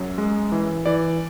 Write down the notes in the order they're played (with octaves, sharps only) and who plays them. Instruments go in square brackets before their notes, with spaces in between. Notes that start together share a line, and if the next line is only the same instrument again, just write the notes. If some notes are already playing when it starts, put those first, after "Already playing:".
Already playing: [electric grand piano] F#2 F#3
G#3
E3
E3 D5